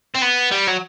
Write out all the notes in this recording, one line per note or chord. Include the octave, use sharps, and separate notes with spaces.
C4
B3
G3
F#3